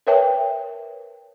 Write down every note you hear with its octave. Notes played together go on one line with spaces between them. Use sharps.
A#4 B4 C#5 E5 G5 A5